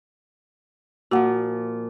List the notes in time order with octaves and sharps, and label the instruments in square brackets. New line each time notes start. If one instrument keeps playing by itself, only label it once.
[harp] A#2 F3 [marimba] F#4 F#5